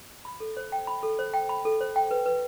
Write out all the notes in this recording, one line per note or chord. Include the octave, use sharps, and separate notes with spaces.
B5
A4
C5
G5
B5
A4
C5
G5
B5
A4
C5
G5
B4
B4